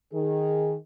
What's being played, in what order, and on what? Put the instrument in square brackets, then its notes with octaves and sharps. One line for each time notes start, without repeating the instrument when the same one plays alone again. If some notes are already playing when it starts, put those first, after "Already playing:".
[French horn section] D#3 G#4